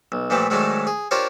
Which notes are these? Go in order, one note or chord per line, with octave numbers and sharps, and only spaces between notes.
B1
A#2 E3 F3 A3 G4
G#2 D#3 F#3 G#3 A3 D4
G#4
D4 F4 G4 A#4 C5 C#5